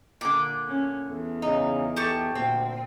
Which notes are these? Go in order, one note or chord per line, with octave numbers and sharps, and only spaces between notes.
A#2 D3 D6
C#4
E2 A4
C#3 D#4
G4 A4 A5 C#6
D2 A#2 C4